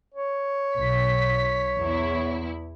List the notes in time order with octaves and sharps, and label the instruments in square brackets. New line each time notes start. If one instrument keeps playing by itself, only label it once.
[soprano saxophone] C#5
[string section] B1 B6
E2 E4